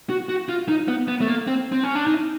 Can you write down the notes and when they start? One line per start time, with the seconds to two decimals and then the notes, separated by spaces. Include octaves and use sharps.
0.10 F#4
0.29 F#4
0.49 F4
0.68 D#4
0.88 B3
1.08 B3
1.21 A3
1.28 A#3
1.47 C4
1.72 C4
1.84 C#4
1.95 D4
2.07 D#4